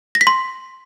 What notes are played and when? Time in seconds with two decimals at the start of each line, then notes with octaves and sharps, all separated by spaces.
0.15 A#6
0.21 B6
0.27 C6